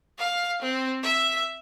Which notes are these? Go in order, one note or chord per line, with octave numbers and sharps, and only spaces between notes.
F5
C4
E5